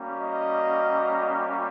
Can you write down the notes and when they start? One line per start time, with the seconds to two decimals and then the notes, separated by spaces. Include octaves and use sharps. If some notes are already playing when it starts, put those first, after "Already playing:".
Already playing: G3 A#3 C#4 F#4
0.19 D#5